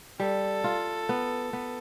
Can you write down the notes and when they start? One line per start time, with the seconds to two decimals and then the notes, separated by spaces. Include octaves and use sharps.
0.20 G3 A4
0.64 F4
1.09 B3
1.53 B3